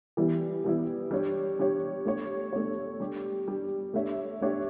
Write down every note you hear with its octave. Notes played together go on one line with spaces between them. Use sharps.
E3 G3 B3 E4
E3 G3 B3 E4
G3 D4 G4 C#5
G3 D4 G4 C#5
A3 D4 G4 C#5
A3 D4 G4 C#5
G3 D4 G4
G3 D4 G4
A3 D4 G4 C#5 E5
A3 D4 G4 C#5 E5